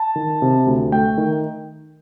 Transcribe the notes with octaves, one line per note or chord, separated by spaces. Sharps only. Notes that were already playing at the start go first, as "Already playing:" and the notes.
Already playing: A5
D#3
C3
D2
A3 G5
D#3